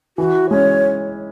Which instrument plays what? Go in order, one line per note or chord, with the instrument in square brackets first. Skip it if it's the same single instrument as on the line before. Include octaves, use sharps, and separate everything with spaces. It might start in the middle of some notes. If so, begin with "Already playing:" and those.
[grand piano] E3 [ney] F#4
[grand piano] G#3 C#4 [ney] C#5